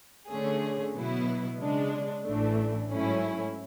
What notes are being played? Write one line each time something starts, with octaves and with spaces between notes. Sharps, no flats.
D3 A3 C#4 G#4
B2 F#3 B3 E4
C#3 G#3 D4
A1 A2 E3 A3 D4
G#2 F#3 A3 C#4 E4